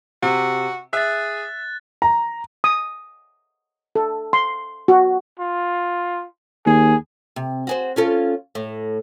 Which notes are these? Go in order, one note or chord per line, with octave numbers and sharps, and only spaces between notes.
C3 F#4
G#4 E5 F#6 A6
A#5
D#6
A4
C6
F#4
F4
D#2 G#4
C3
F#4 G#4 C5
C#4 F4 A4
A2